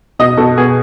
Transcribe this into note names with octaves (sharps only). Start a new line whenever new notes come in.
B2 D#5
B2 A4
B3 G#4